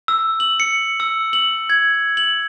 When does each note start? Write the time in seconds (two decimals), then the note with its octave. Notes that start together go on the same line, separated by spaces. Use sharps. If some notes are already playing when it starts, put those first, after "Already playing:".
0.08 E6
0.40 F#7
0.60 C#7
1.00 E6
1.33 F#7
1.70 G#6
2.17 F#7